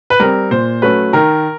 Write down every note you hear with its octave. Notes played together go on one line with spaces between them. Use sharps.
B4
G3 C4 A#4
A#2 C5
F#3 A3 C#4 B4
D#3 A#4